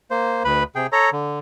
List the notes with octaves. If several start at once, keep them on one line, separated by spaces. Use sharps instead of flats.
A#3 C5
D2 B4 B5
C3 G#4 G5
A4 C#5 A#5
D3